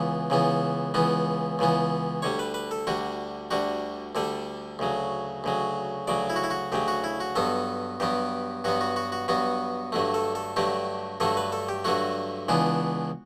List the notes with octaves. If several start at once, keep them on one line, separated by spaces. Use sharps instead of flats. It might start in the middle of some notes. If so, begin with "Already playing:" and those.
Already playing: C#2 C#3 E3 B3
C#2 C#3 E3 B3
C#2 C#3 E3 B3
C#2 C#3 E3 B3
D2 D3 G3 C#5
B4
B4
A4
D2 D3 G3 F#4
D2 D3 G3 F#4
D2 D3 G3 A4
D2 C#3 F#3
D2 C#3 F#3
D2 C#3 F#3 D5
E4
F#4
E4
F#4
D2 C#3 F#3 G4
F#4
E4
F#4
G2 F#3 B3 A4
G2 F#3 B3 G4
G2 F#3 B3 F#4
F#4
F#4
F#4
G2 F#3 B3 F#4
G2 D3 F#3 A3
A4
A4
G2 D3 F#3 A3 G4
G2 D3 F#3 A3 A4
B4
A4
G4
G2 D3 F#3 A3 F#4
C#2 C#3 E3 B3 D4